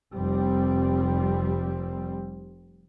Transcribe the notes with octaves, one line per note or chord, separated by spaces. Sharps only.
F1 G3 C4